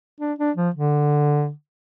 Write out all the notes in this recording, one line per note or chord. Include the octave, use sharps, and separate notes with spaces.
D4
D4
F3
D3